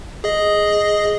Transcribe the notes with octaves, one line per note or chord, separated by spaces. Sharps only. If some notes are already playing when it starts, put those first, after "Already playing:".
G#4 D#5